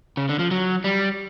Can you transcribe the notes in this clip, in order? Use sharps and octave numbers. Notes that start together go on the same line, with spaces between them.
C#3
D3
F3
F#3
G3